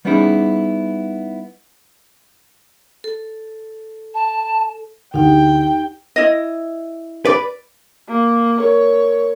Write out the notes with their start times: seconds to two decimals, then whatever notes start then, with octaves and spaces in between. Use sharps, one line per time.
0.05 G3 B3 C#4 D#4 E4 G#4
3.04 A4
4.14 A5
5.14 D2 D#4 G4 F#5 G5
6.16 E4 D#5
7.25 B4 D5
8.08 A#3
8.60 A#4 C#5